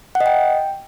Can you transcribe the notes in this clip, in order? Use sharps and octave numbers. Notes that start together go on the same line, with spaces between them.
F#5
D#5
G5